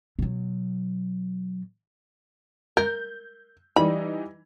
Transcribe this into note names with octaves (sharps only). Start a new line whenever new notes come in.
B2 F#3
A#4 G6
E3 G3 D#4 B5